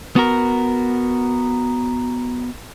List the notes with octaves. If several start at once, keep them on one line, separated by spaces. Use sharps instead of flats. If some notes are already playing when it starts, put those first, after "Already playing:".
B3 F#4 A#4